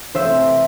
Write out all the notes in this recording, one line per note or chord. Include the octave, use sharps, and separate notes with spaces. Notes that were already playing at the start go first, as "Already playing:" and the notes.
C3 E3 A3 C4 C5 E5